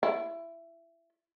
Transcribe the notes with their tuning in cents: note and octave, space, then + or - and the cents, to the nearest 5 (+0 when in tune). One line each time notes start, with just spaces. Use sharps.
E4 +20